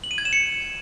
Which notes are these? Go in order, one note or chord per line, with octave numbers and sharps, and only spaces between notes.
F#7
D#7
G#6
E7
C#7